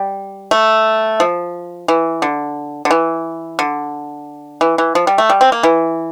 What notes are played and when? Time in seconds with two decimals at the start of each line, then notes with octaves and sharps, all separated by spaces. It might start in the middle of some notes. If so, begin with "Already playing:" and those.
Already playing: G3
0.51 A3
1.20 F3
1.88 E3
2.22 D3
2.85 D3
2.91 E3
3.59 D3
4.61 E3
4.78 E3
4.95 F3
5.07 G3
5.18 A3
5.30 G3
5.41 C4
5.52 A#3
5.63 E3